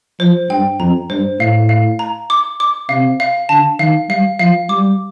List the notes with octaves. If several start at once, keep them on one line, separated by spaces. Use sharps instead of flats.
F3 C5
G2 G5
F2 A#5
G2 C5
A2 F5
F5
A#5
D6
D6
C3 F5
F5
D3 A5
D#3 F5
G3 F5
F3 F5
G3 D6